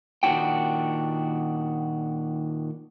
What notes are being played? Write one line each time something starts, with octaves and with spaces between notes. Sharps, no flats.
A#2 D#3 D4 E4 F#4 G5